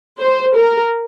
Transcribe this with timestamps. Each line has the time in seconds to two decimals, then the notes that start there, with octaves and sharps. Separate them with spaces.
0.19 C5
0.55 A#4